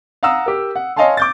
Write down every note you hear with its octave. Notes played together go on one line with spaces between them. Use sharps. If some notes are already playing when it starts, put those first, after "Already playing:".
F5 F#5 A#5 D#6 E6
G4 A#4
F#5
C#5 D#5 F5 G#5 A5 C6
D6 G6 A6